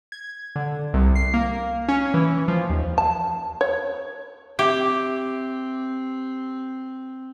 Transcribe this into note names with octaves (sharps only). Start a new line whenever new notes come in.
G#6
D3
C2
C7
A#3
C#4
E3
F3
D#2
A5
C#5
C4 G4 E5 D6